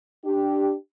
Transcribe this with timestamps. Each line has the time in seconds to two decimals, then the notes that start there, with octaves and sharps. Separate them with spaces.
0.24 D4 G4